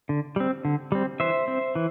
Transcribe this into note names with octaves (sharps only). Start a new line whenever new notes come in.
D3
G3 C4
D3
G3 C4
E3 C5 E5
C4
E3